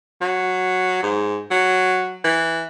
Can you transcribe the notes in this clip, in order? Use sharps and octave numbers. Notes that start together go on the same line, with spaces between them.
F#3
G#2
F#3
E3